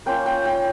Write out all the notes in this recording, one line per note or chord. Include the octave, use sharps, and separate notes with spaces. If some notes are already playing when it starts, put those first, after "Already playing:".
A#3 C#4 F4 G5
G5
G5